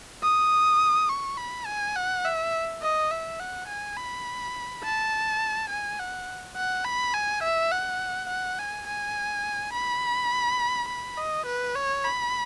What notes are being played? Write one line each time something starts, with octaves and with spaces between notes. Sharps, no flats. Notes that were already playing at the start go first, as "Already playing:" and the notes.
D#6
C#6
B5
G#5
F#5
E5
D#5
E5
F#5
G#5
B5
A5
G#5
F#5
F#5
B5
G#5
E5
F#5
F#5
G#5
G#5
B5
B5
D#5
B4
C#5
B5